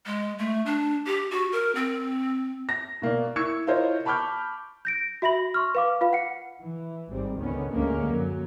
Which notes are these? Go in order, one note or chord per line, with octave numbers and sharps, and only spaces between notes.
G#3
A3
D4
G4
F#4
A#4
C4
A#6
B2 A#3 A#4 D5
E4 C#6 E6 G#6 C#7
E4 F4 A#4 C5 C#5 D#5
A5 B5 C#6 D6 F6 G6
G6 A#6 D7
F#4 E5 B5 A#6 F#7
C6 C#6 F6
B4 F5 D6
F4 B4 F5
F#5 C#7
E3
G#1 G#2 G3 C4
C#2 G#2 D3 D#3 B3 C#4
D2 D3 G#3 A#3 C#4
F#2 F#3